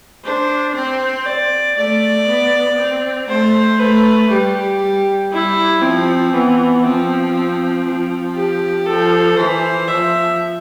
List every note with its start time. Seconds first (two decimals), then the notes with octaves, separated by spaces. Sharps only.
0.24 D4 C5
0.74 C4 C5
1.26 D5
1.77 A3 D5
2.27 B3
2.78 C4
3.29 A3 C5
3.79 A3 B4
4.30 G3 G4
4.80 G3
5.32 G3 E4
5.81 F3 C4
6.33 E3 B3
6.83 F3 C4
7.34 C4
7.85 F3
8.35 G4
8.86 F3 A4
9.37 E3 C5
9.87 F3 E5